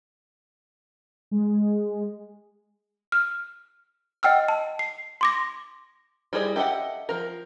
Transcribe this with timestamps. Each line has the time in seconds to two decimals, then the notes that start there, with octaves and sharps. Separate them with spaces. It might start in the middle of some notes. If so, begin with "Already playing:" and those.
1.31 G#3
3.12 F6
4.23 D#5 F#5 G5 E6 F6
4.49 A5
4.79 C7
5.21 C6 D6 A#6
6.33 G3 E4 G#4 C5 D#5
6.56 G4 A4 D#5 E5 F#5
7.09 F3 A#4